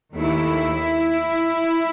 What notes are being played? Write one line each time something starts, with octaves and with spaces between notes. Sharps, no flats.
D#2 D#3 A3 E4